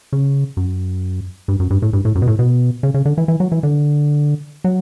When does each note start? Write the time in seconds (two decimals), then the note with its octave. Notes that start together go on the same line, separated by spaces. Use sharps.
0.13 C#3
0.57 F#2
1.48 G2
1.60 F#2
1.70 G2
1.82 A2
1.93 G2
2.05 A2
2.15 F#2
2.22 B2
2.27 A2
2.39 B2
2.83 C#3
2.94 C#3
3.05 D3
3.18 E3
3.28 E3
3.40 F#3
3.52 E3
3.63 D3
4.64 F#3